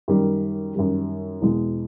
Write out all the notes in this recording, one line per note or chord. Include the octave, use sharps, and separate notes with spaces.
F#2 D#3 G3
F#2 D#3 G3
E2 B2 G#3